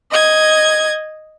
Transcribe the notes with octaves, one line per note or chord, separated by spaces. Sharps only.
D#5 G#6